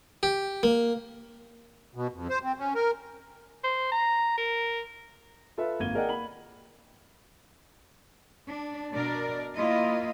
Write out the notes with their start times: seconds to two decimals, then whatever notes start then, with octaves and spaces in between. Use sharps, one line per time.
0.23 G4
0.63 A#3
1.95 B2
2.13 F2
2.29 C5
2.43 C4
2.58 C#4
2.75 A#4
3.64 C5
3.92 A#5
4.38 A#4
5.57 F4 A4 B4 E5
5.80 G#1 A#3 G#6 D#7 G7
5.94 G#4 A#4 D5 D#5 F#5 G5
6.09 A#3 B5 F#7
8.49 D4
8.93 B2 D4 A#4 D5
9.55 A#3 E4 F4 D#5